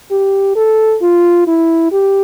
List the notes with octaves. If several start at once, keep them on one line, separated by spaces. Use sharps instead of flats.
G4
A4
F4
E4
G4